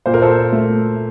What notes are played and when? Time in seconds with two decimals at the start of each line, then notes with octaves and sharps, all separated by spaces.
0.06 A#2 C5
0.14 A#4
0.22 A4 C5
0.53 A3